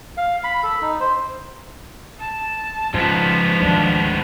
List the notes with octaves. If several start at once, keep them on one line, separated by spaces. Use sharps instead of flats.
F5
B5
A4
D#4
C5
A5
G#2 C#3 F3 B3
D2 D#3 D4